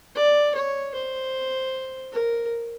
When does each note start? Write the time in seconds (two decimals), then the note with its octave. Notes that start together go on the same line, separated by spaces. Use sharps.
0.16 D5
0.55 C#5
0.95 C5
2.12 A#4